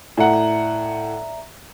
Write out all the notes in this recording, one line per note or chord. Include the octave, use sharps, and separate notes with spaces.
A2 D5 E5 F#5 A#5